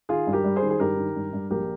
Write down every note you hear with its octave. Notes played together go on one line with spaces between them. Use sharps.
D#3 F4 G#4
G2
G4 A#4
G3
G#4 C5
D#3
G#4
G2 G4 A#4
D#3
G2
G2
A#1 G4 A#4